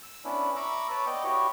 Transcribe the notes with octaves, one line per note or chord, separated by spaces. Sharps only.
E6
B3 C#4 D4 E4
E5 A#5 B5 C#6 D6 E6
B4 C#5 A5 B5
B3 D5 D#5 G5
E4 F#4 G4 C#5